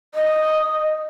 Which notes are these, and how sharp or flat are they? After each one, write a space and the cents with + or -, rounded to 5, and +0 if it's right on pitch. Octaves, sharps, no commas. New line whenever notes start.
D#5 -5